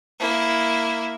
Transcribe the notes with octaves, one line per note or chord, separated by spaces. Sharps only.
A#3 E4